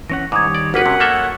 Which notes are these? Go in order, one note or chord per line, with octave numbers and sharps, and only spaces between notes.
E3 C#4 F#5 A#6
G#2 D#3 G3 C#5 D6 D#6 G#6
D5
G1 A#3 F#4 A#4 B4 F#5 B6
C3 C#4
A#3 A4 C#5 E5 E6